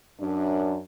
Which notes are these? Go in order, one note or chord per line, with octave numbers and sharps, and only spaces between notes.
F#2 D4